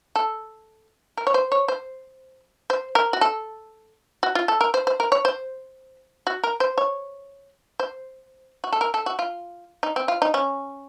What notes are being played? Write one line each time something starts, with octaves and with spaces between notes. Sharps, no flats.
A4
A#4
C#5
C5
C#5
C5
C5
A#4
F#4
A4
F#4
F4
A4
A#4
C5
C5
A#4
C#5
C5
F#4
A#4
C5
C#5
C5
F#4
A4
A#4
A4
F#4
F4
D#4
C4
F4
D#4
C#4